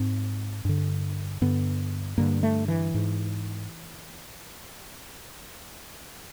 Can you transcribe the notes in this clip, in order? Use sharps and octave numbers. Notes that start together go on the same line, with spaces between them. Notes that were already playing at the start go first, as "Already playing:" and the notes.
Already playing: G#2 C4
G2 D3
G2 D3 B3
G2 D3 A#3
A3
E3
G#2